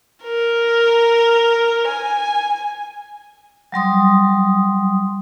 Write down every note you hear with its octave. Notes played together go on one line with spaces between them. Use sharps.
A#4
G#5
F#3 G3 C6 D#6